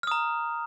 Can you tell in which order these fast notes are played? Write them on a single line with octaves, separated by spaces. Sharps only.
F6 D#6 A#5